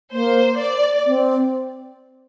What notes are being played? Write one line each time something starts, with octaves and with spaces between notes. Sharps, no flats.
A#3 C5
D5
C4